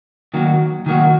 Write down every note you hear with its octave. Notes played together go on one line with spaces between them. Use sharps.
D#3 F#3 A#3 F#4
D#3 F#3 A#3 F#4